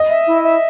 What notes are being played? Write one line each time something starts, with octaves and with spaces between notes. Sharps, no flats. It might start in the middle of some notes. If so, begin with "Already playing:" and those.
Already playing: D#5
E5
E4
E5